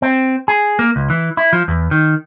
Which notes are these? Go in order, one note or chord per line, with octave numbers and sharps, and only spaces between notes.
C4
G#4
A#3
C#2
E3
E4
F3
E2
D#3